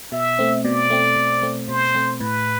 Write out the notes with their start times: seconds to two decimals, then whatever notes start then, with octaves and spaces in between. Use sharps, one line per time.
0.12 B2 E5
0.39 A3 C4
0.65 B2 D5
0.90 A3 C4
1.16 B2
1.43 A3 C4
1.68 B2 C5
1.95 A3 C4
2.21 A2 B4